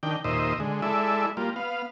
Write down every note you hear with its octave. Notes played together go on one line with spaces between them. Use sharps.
D#3 D4 G5
D#2 A#2 C5 D#5 E5
D3 G#3
G#3 E4 A4 D5 E5
G3 A#3 F4
B3 F5